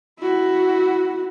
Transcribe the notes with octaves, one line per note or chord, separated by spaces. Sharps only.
E4 F#4